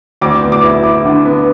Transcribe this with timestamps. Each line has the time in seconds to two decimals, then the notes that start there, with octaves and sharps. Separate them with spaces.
0.21 D2 D6
0.43 B3
0.52 D6
0.63 E4
0.83 E4 D6
1.05 D3
1.25 B3